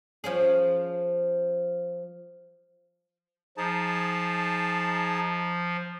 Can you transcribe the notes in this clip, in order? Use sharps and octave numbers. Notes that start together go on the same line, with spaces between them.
F3 C#4 G#4
F3 D#4 G#4 A5